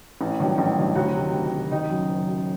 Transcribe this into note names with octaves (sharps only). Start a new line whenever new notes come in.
A1
G2 D#3 F#3
A1
G2 D#3 F#3
D2 F#3 F#4
C3 D#3
D2
C3 D#3
F#1 D#3 D#4
F#2 F#3
F#1
F#2 F#3